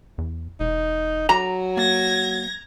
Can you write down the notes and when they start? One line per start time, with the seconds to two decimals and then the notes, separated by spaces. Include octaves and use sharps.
0.18 E2
0.60 E1 D#4
1.29 F#3 A#5
1.77 A#3 G#6 A#6